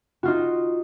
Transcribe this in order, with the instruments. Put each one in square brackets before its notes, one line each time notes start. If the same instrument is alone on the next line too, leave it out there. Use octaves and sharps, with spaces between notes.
[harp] D#4 F4 F#4